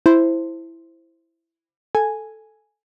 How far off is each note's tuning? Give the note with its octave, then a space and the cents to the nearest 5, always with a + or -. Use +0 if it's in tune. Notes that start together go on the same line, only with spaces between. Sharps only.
E4 +5 C5 +0 A5 +20
A4 -5 G#5 +0